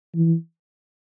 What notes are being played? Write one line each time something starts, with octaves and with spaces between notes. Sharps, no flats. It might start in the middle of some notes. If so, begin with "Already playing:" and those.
E3